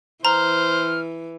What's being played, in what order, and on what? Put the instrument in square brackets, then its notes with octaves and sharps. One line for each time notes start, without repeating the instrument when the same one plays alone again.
[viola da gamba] E3 [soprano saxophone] C5 [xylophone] A#5 [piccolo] F6